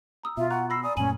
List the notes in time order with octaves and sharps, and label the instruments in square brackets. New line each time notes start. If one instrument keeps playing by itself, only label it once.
[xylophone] A#5 D#6 E6
[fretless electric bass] B2 [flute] F4 [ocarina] E5
[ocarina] F#5 [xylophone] A#5 C#6 F#6
[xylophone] B5 A#6 C7 [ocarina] E6
[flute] D5 [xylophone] G#5 A#5 [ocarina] D#6
[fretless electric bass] F#2 A#2 A3 [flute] C#4 [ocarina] G#5 [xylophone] D#7 F#7